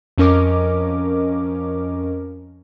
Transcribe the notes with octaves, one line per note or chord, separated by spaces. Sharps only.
F2 F3 C#4 A#4 D#5 D6